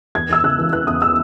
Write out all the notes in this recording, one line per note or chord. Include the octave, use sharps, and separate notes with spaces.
E2 G#6
E2 E6
C#3 F#6
E3
E3 F#6
E2 D#6
E6